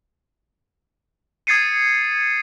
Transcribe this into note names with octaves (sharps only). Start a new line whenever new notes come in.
D#6 G#6 A6 C7 C#7 D#7